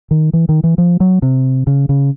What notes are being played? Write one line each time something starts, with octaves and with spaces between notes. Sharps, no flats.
D#3
E3
D#3
E3
F3
F#3
C3
C#3
C#3